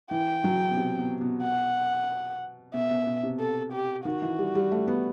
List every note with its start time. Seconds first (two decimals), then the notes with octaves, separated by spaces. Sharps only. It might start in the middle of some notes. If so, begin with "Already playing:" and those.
0.11 E3 G5
0.44 F#3
0.71 B2
0.77 C3
0.99 B2
1.21 B2
1.43 F#5
2.74 B2 E5
2.90 B2
3.07 B2
3.23 C3
3.39 A4
3.73 G4
4.05 D#3 F#4
4.22 E3
4.39 G3
4.55 G3
4.72 A3
4.88 B3